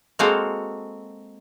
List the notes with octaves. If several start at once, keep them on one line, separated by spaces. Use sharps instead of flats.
G#3 A#3 C4 F#4 A4 F5